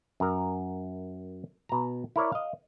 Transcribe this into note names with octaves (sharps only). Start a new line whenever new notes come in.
F#2 A#4
B2 A#5
E4 A#4 C#5 D5
D#5 F5